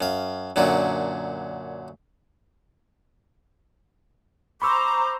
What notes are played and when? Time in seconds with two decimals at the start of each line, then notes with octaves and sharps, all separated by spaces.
0.01 F#2 F5
0.56 F#2 A#2 D3 F#3
4.62 C5 A#5 B5 C#6 D6 E6